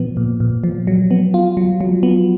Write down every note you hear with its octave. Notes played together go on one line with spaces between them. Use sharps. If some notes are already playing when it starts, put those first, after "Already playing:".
Already playing: A#2 F3 B3
A#2
A#2
F3
F#3
B3
F4
F#3
F#3
B3